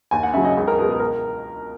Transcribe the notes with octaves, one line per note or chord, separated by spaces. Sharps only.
D#2 G#5
F#5
C#3 F#3 E5
D#5
C#2 G#4
A#4
B2 G#3 B3 G#4
G#4
A#4